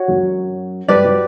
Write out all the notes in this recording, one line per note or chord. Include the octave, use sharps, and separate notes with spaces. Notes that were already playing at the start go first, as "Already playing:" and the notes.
Already playing: F#4 C#5 F#5
F#2 F#3
G2 G3 G4 B4 D5
F#3